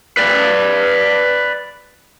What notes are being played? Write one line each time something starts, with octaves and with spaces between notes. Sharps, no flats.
B4 D5